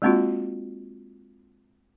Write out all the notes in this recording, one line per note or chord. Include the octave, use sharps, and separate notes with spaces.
G#3 A#3 C4 D4 F4 F#4